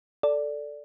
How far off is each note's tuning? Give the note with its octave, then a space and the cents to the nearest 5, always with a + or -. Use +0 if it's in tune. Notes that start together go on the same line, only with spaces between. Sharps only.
A4 +0 D5 -5